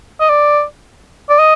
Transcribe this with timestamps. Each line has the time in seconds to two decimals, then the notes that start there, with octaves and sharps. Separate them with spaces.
0.20 D#5
0.30 D5
1.29 D5
1.39 D#5